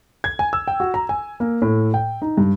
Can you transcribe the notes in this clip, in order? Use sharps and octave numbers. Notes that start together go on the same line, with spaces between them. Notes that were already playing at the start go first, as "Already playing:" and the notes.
G#6
G#5
E6
G5
F#4
A#5
G#5
A#3
A2
G5
D#4
G2